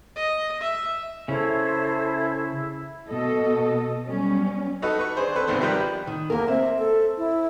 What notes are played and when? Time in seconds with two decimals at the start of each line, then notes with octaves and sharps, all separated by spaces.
0.16 D#5
0.61 E5
1.28 C#3 C#4 E4 A4 C5 C#5 E5
3.09 B2 A4 D#5
4.07 F#3 G3 B3 C#4
4.82 D#4 F#4 A4 B4
4.99 B4 C#6
5.17 D4 G#4 C5
5.36 C4 A4 B4
5.47 G#1 G#2 C3 D#3 B3 C5
5.61 D#3 F3 G3 G4 A#4 B4
6.07 D#3
6.30 E2 A#3 A#4
6.48 C4 E5
6.79 A4
7.17 E4